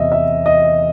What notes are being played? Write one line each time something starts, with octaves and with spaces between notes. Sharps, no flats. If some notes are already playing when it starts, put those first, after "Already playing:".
Already playing: E2 C3 D#5 E5
E5
D#5